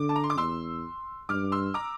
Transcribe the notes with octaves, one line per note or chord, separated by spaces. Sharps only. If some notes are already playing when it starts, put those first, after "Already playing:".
Already playing: D3 D6
A5
A#5
C6
D6
E2 C6 E6
G2 D6 F6
C6 E6
A#5 D6